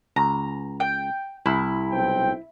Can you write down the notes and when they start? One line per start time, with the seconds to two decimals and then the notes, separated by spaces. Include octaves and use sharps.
0.16 C#2 A#5
0.80 G5
1.46 C2 E4
1.91 B1 C4 G5